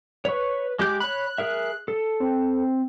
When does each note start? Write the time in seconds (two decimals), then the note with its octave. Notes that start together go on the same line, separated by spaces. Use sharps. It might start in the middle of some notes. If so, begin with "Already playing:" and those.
0.25 B4 C#5 C#6
0.79 G#3 G4 D6 G6
1.00 C#5 B5 F#6
1.38 G#4 A#4 E5
1.88 A4
2.20 C4